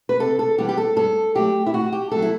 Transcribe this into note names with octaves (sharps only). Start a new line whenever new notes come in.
B4
C3 A4
A4
E3 G3 B3 G4
G4
A4
G2 A4
F#3 A3 G4
E4
A2 F#4
G4
F#3 A3 A4
E4